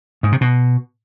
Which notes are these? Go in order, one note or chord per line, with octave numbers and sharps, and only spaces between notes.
G#2
C3
B2